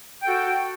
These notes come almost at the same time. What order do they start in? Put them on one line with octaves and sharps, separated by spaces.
G5 A4 F#4